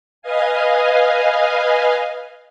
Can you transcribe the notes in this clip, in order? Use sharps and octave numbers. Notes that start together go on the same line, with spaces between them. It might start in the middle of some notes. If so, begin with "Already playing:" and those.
B4 D#5 F5 G#5